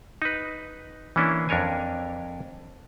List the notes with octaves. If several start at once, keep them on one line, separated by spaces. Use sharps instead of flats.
D#4 B4
E3 A#3 C#4 D4 E4
F2 D4 A#4 C#5 G#5